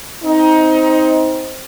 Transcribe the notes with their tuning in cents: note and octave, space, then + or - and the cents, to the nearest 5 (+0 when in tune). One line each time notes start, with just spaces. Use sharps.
C4 +0 D#4 +20